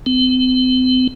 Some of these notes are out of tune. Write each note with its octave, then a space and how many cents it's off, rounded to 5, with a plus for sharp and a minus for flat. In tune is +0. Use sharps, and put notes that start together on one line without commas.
C4 -40